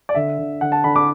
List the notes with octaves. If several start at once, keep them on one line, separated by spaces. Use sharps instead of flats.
D5
D3 E5
D3
D3 F#5
A5
D3 B5
D6